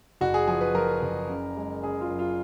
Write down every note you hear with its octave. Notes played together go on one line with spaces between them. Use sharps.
F#1 F#4
G#4
F3 G#4
B4
F3 A#4
F#1
C#3
G#3
C#3 G#4
F4
F#2
F4